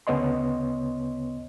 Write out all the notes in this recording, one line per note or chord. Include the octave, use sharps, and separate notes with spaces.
D2 C#3 B3 C#5 D#5 C6